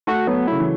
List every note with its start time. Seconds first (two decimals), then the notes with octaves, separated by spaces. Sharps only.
0.07 A3 F#4
0.27 F#3 B3
0.48 C#3 E4
0.59 E3